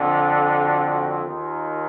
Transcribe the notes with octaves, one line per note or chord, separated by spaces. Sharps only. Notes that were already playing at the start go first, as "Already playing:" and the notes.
Already playing: F2 D3
F#4
F#4
D#2 D#3 F4